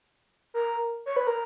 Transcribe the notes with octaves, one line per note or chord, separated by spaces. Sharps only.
A#4
C#5
B4
A#4